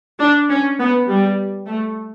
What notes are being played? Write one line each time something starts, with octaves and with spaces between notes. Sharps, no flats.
D4
C#4
B3
G3
A3